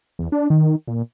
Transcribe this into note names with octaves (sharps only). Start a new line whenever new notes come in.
E2
D4
D#3
A#2